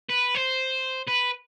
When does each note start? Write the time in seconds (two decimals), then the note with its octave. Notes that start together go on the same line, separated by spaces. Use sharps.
0.10 B4
0.35 C5
1.08 B4